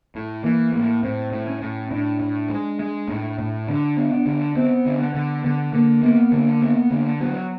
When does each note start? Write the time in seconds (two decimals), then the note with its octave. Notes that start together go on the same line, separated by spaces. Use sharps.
0.15 A2
0.44 E3 A#3
0.73 A2 A#3
1.02 A2 C4
1.32 A2
1.46 C#4
1.62 A2
1.91 A2 D4
2.20 A2
2.49 G#3
2.79 G#3
3.08 A2
3.39 A2
3.67 D3 D4
3.97 B3
4.11 D4
4.26 D3
4.55 B3 C4
4.85 D3
5.00 B3
5.14 D3
5.44 D3 B3
5.73 D3 A#3
6.03 A#3 B3
6.32 D3 A#3
6.62 B3
6.91 D3
7.21 F#3 B3